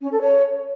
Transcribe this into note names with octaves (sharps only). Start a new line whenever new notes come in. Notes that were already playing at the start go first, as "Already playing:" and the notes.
C#4
A4
C#5